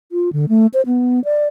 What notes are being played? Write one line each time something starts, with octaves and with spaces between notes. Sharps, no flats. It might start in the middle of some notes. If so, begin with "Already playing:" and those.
F4
D3
A3
C5
B3
D5